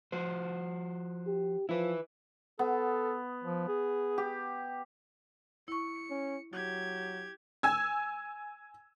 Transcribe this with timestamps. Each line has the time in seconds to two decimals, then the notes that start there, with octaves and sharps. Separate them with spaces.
0.12 F3 F#4 C5
1.27 G4
1.69 F3 E4 B4
2.59 B3 A4
3.43 F3
3.68 G#4
4.18 G4
5.68 E4 C#6 C#7
6.10 C#4
6.53 F#3 G4 G#6
7.63 G#5 E6 G#6